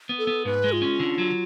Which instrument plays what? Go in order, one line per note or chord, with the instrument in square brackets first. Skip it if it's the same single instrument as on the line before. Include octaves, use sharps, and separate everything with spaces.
[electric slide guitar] B3
[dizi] A4
[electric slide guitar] B3
[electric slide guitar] G#2 [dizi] B4
[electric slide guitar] G#3
[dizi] F4
[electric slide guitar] C#4
D3
F#3